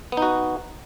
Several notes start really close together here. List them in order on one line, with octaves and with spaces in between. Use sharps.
B3 D#4 F#4